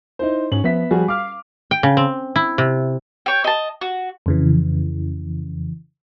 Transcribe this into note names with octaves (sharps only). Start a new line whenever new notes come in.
D#4 E4 C5
G#2 C#4 F#7
F3 B3 E5 B6
F3 G3 F#4 G#4
F5 D6 F6
G5
C#3
C4
E4
C3
C#5 G5
D#5 A5
F#4
F2 C#3 E3